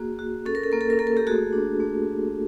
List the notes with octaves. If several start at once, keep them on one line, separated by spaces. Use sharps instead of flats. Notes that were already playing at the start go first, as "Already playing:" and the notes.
Already playing: A#3 F#4 G#4
F#4
C#4 A4
A#4
A4
A#3 A#4
A4
A#4
A#3 A4
A#4
G4 A4
A3 F#4 G#4
D4
A3